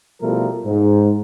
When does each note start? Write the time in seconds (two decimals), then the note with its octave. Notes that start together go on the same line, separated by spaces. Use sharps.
0.22 B2 F3 G3 A3 E4 A#4
0.65 G#2